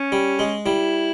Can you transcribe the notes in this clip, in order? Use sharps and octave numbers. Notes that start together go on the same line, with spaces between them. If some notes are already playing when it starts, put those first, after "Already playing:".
Already playing: C#4
G3
G#3
G3 E4